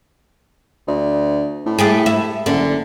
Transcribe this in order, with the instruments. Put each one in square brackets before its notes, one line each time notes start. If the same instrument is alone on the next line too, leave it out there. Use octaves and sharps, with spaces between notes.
[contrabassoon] D2
A2
[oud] A3 G4 G#4
E4
[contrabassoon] F#1 [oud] D3